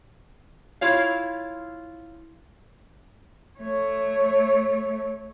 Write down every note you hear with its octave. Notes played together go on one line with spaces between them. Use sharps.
E4 F4 C#5 F5
A3 C#5